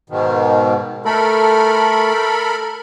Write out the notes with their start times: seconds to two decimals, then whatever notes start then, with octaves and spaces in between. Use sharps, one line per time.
0.10 G#2 B2 D#3
1.05 A3 A4 A#4 B5